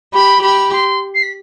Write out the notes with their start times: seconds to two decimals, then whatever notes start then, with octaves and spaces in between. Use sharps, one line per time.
0.13 G4 B5
0.43 G4 B5
0.73 C6
1.15 C7
1.23 B6